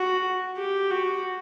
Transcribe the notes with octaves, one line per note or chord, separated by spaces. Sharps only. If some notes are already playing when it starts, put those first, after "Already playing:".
Already playing: F#4
G4
F#4